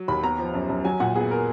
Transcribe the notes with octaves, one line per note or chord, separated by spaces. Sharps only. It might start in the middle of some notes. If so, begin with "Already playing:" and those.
Already playing: F#3
D#2 B5
B3 A#5
F3
F#2
F#2
F#3 G#5
A#2 F#5
B3 G#4
A#4